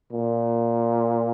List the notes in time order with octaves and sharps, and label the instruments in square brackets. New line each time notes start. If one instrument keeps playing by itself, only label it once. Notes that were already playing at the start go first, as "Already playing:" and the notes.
[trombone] A#2